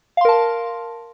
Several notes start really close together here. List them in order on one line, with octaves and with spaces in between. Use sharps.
F5 C6 A#4 A5